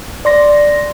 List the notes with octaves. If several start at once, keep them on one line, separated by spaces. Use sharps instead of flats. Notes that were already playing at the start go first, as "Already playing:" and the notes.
D5 C6 A#6